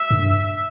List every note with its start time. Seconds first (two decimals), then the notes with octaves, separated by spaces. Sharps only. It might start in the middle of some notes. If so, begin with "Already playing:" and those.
Already playing: E5
0.11 G2